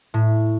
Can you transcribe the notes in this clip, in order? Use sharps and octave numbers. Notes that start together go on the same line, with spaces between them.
A2